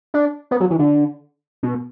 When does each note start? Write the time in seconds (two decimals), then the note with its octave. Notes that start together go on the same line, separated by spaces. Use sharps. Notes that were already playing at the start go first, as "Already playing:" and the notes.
0.14 D4
0.51 B3
0.60 F#3
0.70 E3
0.79 D3
1.63 B2